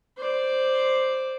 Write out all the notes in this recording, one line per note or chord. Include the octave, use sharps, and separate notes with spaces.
C5 D5